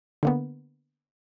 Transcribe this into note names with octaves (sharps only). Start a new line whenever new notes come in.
D3 A#3 B3